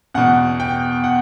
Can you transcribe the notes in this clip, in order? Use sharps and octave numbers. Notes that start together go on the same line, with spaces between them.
E2 B2 F#5
G5
F#5